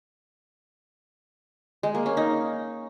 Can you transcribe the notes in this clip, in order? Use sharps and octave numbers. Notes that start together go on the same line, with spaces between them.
G#3
A#3
C#4
D#4